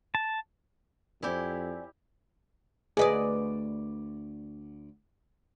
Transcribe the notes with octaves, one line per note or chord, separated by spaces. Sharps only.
A5
F2 C4 E4 G4 D5 G#5
D2 G#4 B4 D5 D#5